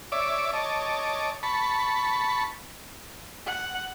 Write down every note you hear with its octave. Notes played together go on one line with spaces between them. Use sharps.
C#5 D5 E5 D6
C#5 D#5 A5 D6
A5 B5 C#6
F#5